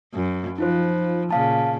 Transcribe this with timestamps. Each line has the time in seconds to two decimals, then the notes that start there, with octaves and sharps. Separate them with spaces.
0.14 F#2
0.58 F3 D#4 F4 C5
1.31 A#2 C#3 F5 A5